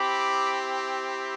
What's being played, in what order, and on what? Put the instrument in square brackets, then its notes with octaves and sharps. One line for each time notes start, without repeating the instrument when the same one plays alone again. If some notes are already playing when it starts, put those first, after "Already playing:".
Already playing: [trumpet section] C4 E4 G4 B5 D6